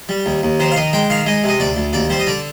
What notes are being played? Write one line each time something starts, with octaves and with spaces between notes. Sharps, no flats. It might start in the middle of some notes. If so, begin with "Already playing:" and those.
G3
D#2
D#2
D#3 C5
F5
D#3 D#5
G#3 G5
D#3 F5
G#3 D#5
C3 D#5
D2 D5
D2
D#2 D5
G3 C5
D#5
D3 D5